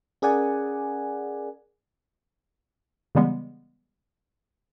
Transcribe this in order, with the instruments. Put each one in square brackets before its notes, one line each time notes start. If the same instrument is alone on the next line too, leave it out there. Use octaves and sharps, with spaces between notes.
[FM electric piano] C#4 G#4 A#4 D5 F#5 G#5
[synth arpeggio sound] C#3 E3 G3 G#3 B3